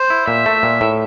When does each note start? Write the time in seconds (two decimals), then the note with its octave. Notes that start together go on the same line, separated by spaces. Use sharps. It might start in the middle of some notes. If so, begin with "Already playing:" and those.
Already playing: C5
0.10 E4
0.28 A#2 E5
0.46 A3
0.63 A#2
0.81 A2